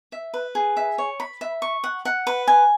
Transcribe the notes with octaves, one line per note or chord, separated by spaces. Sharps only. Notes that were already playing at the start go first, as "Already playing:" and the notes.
E5
B4
G#4
E5
C#5
B5
E5
C#6
F#5
F#5
B4
G#5